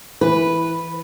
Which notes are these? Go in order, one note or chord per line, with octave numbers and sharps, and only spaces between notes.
E3 B4